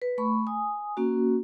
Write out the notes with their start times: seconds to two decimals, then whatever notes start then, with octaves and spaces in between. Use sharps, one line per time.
0.02 B4
0.18 A3 B5 C#6
0.47 G#5 D#6
0.97 A#3 C#4 F#4